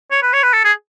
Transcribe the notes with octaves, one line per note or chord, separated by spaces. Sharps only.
C#5
B4
C#5
B4
A4
G#4